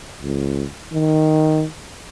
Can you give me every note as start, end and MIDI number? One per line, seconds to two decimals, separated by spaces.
0.22 0.65 37
0.93 1.65 51